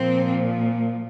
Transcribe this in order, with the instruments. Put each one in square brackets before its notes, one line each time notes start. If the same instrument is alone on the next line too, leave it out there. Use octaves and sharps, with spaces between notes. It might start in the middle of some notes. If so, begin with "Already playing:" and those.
Already playing: [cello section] A#2 F3 C4